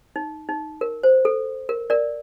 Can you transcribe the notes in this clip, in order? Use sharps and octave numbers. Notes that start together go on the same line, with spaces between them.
D#4
D#4
A#4
C5
A4
A#4
A#4 D5